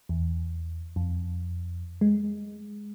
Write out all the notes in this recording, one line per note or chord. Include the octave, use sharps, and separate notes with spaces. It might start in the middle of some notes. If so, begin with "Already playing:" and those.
E2
F2
G#3